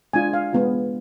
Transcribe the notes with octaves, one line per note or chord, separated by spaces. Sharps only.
G#3 D4 F4 G#5
F5
G#3 B3 F4